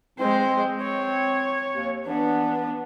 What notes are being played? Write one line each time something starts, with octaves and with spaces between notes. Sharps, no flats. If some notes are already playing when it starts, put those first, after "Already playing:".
G#3 C4 C5
C#5
D#2
E3 B3 D4